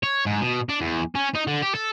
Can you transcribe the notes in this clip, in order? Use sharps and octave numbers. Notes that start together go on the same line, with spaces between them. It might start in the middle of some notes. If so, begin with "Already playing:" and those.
C#5
G#2
B2
D4
E2
C#4
D#4
D3
G4
A4